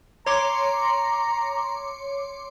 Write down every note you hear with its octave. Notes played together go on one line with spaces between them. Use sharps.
C#5 A#5 C6 D6